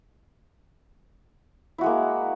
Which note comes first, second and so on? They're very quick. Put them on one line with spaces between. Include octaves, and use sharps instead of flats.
E4 F#4 G#3 A#3